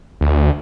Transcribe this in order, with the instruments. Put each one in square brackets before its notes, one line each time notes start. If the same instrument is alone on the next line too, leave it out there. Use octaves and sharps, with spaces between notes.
[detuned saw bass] D2